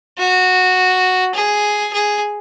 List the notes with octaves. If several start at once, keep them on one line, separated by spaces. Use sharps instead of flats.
F#4
G#4
G#4